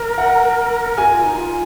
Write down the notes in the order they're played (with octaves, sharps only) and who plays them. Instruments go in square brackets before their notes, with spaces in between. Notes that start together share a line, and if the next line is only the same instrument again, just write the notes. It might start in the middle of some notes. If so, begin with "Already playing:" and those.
Already playing: [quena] A#4
[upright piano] F#5
[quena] F#4 [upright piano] G#5
[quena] F4
D#4
F4